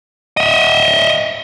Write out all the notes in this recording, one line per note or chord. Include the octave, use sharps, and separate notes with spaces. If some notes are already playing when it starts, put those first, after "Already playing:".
D#5 E5